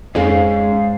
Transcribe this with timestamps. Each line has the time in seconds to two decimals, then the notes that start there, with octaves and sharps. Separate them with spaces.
0.15 F2 G#2 C#4 G#4 F5